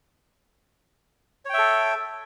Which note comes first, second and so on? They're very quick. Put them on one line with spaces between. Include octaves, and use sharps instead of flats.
C#5 G5 E5 A4